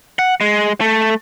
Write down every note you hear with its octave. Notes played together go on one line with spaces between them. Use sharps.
F#5
G#3
A3